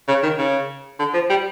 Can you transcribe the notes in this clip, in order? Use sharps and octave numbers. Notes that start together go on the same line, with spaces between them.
C#3
D#3
C#3
D3
F3
G3